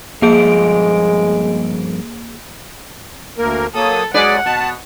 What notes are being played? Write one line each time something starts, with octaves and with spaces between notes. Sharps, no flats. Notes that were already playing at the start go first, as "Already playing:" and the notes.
G2 F3 G#3 A#3 G#4 F5 D7
D2 A#3 A#4
F#3 A#3 A4 D#6
F#3 G#3 G#4 B4 D5 F#5
B2 A5